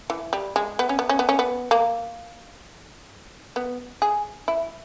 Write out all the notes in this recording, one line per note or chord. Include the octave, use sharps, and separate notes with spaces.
E3
G3
G#3
B3
C#4
B3
C#4
B3
C#4
B3
A#3
B3
G#4
E4